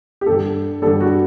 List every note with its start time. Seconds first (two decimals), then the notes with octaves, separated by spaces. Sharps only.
0.21 G4
0.26 G2 D3 G3 A4
0.82 G2 D3 G3 A4
1.01 F#4